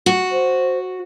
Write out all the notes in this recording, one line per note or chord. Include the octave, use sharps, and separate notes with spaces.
F#4
C5